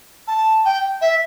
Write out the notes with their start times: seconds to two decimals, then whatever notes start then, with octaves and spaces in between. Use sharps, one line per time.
0.28 A5
0.65 G5
1.01 E5